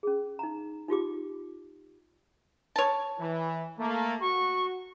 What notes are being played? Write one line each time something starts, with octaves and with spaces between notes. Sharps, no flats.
C#4 G#4
D#4 A#5
D#4 F4 G4 D6
C#5 A5
E3
A3 A#3
F#4 C#6